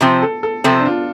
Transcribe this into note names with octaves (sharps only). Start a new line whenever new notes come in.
C3 F3 C4
A4
A4
C3 F3 C4 A4
D4
F4